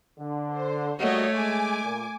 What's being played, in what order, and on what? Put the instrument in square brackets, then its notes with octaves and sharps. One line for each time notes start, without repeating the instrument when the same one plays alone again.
[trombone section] D3
[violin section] C5
[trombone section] G3 A#3 F#4 [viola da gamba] A3 [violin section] C#5 D#5
[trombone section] G#3 [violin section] G#5 D6
[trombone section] A#2